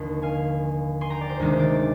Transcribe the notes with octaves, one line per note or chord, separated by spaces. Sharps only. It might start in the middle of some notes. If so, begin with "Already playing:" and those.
Already playing: F1 D#2 D3 C6
F5 G#5
G#5 C6
G5 A#5
D5
C5
D2 C3 D#3 G#3 D#4 C5
D5
D5